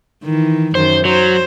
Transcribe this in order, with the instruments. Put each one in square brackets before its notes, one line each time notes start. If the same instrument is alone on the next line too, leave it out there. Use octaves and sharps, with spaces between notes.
[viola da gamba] D#3 E3
[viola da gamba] F#2 D#3 [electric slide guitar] C5
[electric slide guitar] F#3 [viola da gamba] C5